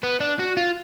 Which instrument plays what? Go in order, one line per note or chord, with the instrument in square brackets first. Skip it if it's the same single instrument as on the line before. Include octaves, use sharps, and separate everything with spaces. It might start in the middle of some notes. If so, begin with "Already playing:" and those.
[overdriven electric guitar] B3
D4
F#4
F4